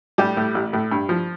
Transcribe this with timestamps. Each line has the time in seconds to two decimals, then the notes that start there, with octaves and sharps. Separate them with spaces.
0.18 A2 G3 G4
0.37 A2
0.54 A1
0.73 A2
0.91 G2
1.09 F3